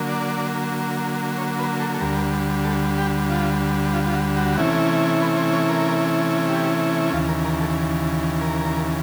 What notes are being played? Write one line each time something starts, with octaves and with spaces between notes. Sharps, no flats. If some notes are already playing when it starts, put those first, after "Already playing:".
Already playing: D3 F#3 A#3
D5
C#5
B4
A4
A4
D2 D3 G3 A#4
A4
G4
F4
F4
F4
F#4
F#4
C3 E3 A3 C#4 E4
B4
C5
C#5
A#4
G4
D#2 C#3 E3 F4
A#4
A#4
A4
A#4